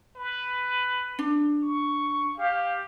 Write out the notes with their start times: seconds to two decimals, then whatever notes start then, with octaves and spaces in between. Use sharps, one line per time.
0.16 B4
1.19 D4
1.63 C#6
2.38 G4 F5